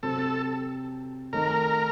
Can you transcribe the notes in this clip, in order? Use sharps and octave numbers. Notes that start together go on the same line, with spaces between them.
C3 F#3 C4 A4
D#3 A3 D#4 A#4